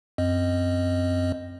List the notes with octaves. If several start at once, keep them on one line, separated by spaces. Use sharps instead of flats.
F#2 C4 D#5